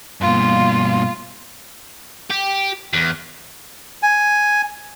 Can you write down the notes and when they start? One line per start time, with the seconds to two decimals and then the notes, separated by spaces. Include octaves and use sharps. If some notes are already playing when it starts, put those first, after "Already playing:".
0.21 G2 B2 G3 A#3 F4 F5
2.30 G4
2.94 E2
4.03 G#5